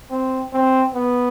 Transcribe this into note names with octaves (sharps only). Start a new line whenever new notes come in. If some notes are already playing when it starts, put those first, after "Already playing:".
C4
C4
B3